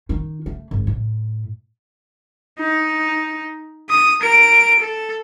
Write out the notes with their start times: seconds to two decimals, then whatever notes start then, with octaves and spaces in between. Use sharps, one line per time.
0.09 D#3 D#4
0.46 A3
0.71 G#1
0.87 A2
2.58 D#4
3.89 D#6
4.21 A#4 D7
4.79 A4